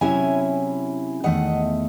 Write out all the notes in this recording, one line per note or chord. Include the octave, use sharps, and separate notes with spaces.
C3 F#3 C#4 E4 E5 G#5
E2 D#3 A3 D#5 F#5